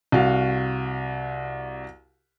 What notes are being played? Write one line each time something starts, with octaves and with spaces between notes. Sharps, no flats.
C2 F#4 F5